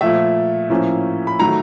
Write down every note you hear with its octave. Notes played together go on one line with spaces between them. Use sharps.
A#2 F3 A3 E5
A2 F3 A#3 C#4
B5
D#3 F#3 A3 A#5